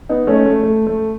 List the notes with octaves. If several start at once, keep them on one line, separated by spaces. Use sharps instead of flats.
B3 D#4
A3 C#4
A3
A3
A3